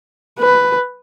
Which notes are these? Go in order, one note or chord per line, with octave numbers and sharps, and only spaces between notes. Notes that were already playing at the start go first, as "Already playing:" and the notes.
B4